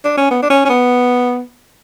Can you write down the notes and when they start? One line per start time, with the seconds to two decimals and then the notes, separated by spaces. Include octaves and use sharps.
0.05 D4
0.17 C#4
0.31 B3
0.42 D4
0.50 C#4
0.65 C#4
0.70 B3